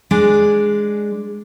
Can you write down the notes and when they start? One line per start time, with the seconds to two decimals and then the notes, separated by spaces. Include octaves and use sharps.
0.11 G#3 D4 D5